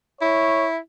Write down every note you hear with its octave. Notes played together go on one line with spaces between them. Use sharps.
E4 C#5